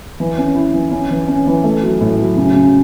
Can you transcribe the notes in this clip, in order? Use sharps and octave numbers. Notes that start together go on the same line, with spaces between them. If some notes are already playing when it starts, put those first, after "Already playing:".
E3
C#4
E4
E3
C#4
E3
C#4
E3
A3
F#3
A2
F#3
C#3
C#3